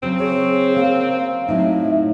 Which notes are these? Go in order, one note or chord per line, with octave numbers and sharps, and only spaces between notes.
C#3 F#3 C4
G#4 C#5
A#3 F5
A2 F#3 C4 D#4 E5